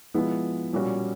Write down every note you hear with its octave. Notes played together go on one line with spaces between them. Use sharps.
F3 G#3 B3 E4
A#2 G3 A#3 C#4 F#4